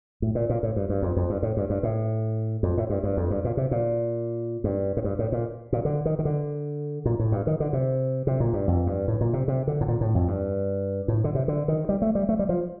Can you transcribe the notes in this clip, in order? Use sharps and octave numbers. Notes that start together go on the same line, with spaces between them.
A2
A#2
A#2
A2
G2
G2
F2
F2
G2
A2
G2
G2
A2
F2
A2
G2
G2
F2
G2
A#2
C3
A#2
G2
A2
G2
A2
A#2
A#2
D3
D#3
D#3
D3
A#2
A2
G2
D#3
D3
C3
C3
A#2
G2
F2
G2
A2
A#2
C3
C3
D3
A2
A#2
A2
F2
G2
A2
D3
C3
D3
D#3
G3
A3
G3
A3
G3
F3